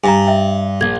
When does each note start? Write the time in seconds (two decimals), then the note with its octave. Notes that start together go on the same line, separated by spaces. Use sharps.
0.04 G2 G#5 A#5
0.27 E5 G5
0.81 A#1 G#6